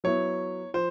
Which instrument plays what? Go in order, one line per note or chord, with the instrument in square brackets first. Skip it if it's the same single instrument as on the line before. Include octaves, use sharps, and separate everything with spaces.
[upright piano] F#3 B3 E4 [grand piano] C#5
[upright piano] F3 [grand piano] C5